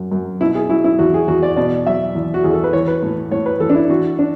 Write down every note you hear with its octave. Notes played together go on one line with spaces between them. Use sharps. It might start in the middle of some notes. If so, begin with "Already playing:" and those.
Already playing: F#2
F#2
B2 E4
G#4
F#3 E4
E4
E2 F#4
G#4
E2 F#4
D5
B2 D5
F#3 E5
E2
F#4
E2 G#4
A4
B4
E3 C#5
B4
A2
A2 C#5
B4
E3 A4
D4
E4
E3 F#4
D4